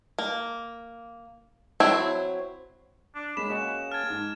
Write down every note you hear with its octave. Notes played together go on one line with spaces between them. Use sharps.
A#3
F#3 C4 E4 C#5
D4
G#3 A#3 C#4 B5 E7
A#3 C#4 F#4 G#4 D#5 G#5
A5 F6 G#6
G#2